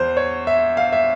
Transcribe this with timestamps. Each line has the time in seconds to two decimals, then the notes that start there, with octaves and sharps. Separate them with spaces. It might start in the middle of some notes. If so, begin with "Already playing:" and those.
Already playing: E2 C5
0.17 C#5
0.47 E5
0.77 F5
0.92 E5